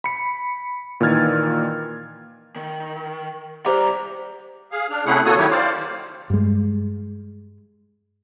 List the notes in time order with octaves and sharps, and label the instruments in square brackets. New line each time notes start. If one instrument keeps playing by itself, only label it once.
[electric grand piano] B5 C#7
A#2 D#3 E3 F6 G#6 A6
[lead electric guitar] D#3
[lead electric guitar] C2 A#5 [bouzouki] G3 [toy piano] C5 D6
[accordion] G#4 F5
D4 F6
C3 A3 C#4 E4 G#4 F#5
D2 A#3 F#4 A4 C#5 D#6
D#3 F#3 E4 G4 C#5
C5 D5 F5
[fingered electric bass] G2 G#3